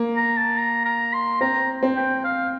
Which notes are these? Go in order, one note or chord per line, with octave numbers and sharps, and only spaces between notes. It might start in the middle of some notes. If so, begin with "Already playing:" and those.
Already playing: A#3
A#5
A5
A#5
A#5
C6
C4 A#5
C4
G5
F5